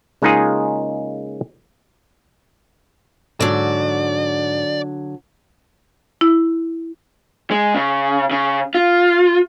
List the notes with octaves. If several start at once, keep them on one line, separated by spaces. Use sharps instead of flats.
C#3 G#3 A#3 D#4 F4 G#4
G#2 D3 F#3 D5
E4
G#3
C#3
C#3
F4